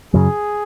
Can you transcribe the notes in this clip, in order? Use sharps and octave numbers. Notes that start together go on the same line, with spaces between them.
F#2 C#3 F#3 G#4